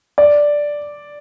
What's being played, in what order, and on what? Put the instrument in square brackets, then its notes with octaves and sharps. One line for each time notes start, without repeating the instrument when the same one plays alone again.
[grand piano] D5